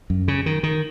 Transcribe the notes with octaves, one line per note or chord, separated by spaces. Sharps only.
F#2
C#3
D#3
D#3